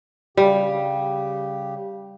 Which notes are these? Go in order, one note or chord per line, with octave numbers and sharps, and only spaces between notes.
C#3 G3 G4